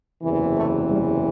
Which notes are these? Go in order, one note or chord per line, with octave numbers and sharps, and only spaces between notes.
F#1 E2 C3 E3
A3
G3